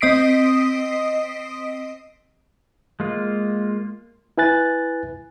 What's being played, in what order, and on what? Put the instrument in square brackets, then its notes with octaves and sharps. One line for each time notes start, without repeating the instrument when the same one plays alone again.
[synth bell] C4 D#5 D#6 B6 C7 D7
[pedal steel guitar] G#3 A#3 F4
[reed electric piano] E4 B4 G#5 F#6 A6